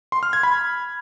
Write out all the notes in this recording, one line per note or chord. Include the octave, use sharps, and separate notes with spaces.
C6
F6
G#6
B5